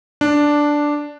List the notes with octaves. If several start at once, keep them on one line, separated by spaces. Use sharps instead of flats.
D4